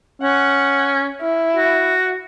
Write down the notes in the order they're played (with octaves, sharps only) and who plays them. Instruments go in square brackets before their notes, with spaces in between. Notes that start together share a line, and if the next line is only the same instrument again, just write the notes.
[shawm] C#4 [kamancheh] F#5
[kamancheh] E4
[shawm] F#4